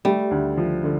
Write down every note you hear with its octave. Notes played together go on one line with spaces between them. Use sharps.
G3 A3
D2
F3
D3